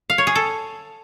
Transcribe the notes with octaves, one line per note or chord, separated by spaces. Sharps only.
F5
C#5
G#4
A4